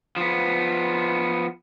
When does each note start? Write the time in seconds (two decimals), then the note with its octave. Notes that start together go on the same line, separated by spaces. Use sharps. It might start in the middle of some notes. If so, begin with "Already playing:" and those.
0.16 F3 B3